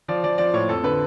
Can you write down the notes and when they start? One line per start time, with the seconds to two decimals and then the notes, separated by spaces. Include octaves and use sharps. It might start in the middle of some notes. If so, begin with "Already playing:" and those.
0.08 F3 D5
0.23 F3 D5
0.38 F3 D5
0.53 A2 C#5
0.68 F2 A4
0.83 D3 B4